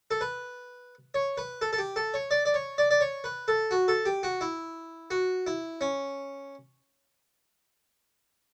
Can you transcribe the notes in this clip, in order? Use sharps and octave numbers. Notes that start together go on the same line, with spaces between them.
A4
B4
C#5
B4
A4
A4
G4
A4
C#5
D5
D5
C#5
D5
D5
C#5
B4
A4
F#4
A4
G4
F#4
E4
F#4
E4
C#4